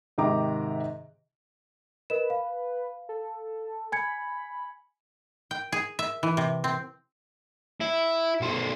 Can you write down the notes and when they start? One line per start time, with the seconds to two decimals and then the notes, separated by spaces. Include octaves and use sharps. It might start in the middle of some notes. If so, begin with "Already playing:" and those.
0.18 G#2 C3 D#3 G4 A#5 D6
2.10 A#4 B4 D#5 E7
2.30 F5
3.09 A4
3.92 G#5 B5 G#6 C#7
5.51 G5
5.72 G#4
5.99 E5
6.23 E3
6.37 C3
6.64 C4
7.80 E4
8.41 B1 C5